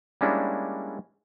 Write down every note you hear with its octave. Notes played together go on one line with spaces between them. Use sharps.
G3 G#3 A#3 C#4 D4 E4